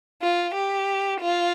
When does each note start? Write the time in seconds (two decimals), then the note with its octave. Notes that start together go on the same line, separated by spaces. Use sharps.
0.22 F4
0.54 G4
1.21 F4